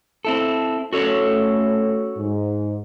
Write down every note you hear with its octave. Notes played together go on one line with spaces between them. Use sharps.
C4 E4 A4
A3 C#4 F#4 A4 C#5
G#2